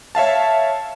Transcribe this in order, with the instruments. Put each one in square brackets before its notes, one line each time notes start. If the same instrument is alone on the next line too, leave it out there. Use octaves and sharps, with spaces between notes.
[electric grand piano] C#5 E5 F5 A5